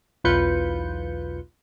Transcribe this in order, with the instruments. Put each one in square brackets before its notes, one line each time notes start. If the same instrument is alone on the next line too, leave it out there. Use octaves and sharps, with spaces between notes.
[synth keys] B1 E2 F4 B4 G6 C#7